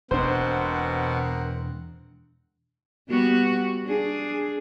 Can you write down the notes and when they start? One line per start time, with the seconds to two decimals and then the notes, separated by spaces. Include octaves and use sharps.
0.11 E1 B2 C4 D4 A#4 C5 F#5
3.08 G3 B3 F#4
3.84 D4 G#4